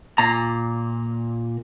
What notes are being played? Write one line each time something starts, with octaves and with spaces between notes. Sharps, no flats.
A#2 A#5